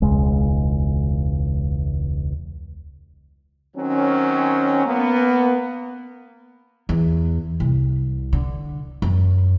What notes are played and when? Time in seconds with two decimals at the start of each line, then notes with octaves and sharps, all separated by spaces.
0.02 E1 C#2 G#3
3.76 D#3 F#3 C4 C#4
4.86 A#3 B3
6.89 E2
7.60 C2
8.33 D3
9.02 F#2